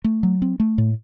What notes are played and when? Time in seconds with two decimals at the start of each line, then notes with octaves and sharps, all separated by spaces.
0.04 A3
0.23 F#3
0.42 C4
0.60 A3
0.78 A2